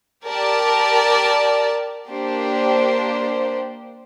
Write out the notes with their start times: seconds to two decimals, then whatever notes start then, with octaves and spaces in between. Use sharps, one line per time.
0.25 G4 A#4 D5 A5
2.09 A#3 D4 G4 C5